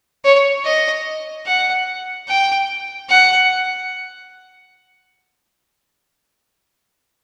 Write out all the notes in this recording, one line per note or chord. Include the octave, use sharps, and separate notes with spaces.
C#5
D#5
F#5
G5
F#5